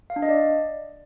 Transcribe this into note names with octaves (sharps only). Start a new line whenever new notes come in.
F5
D4
D#5
D5